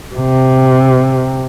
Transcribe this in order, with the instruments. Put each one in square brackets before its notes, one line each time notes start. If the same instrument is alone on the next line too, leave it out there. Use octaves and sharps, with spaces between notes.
[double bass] C3